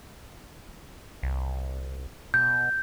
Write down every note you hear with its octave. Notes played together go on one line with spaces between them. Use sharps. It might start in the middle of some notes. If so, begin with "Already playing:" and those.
C2
B2 G6